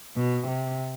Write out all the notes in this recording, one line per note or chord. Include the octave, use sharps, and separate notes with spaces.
B2
C3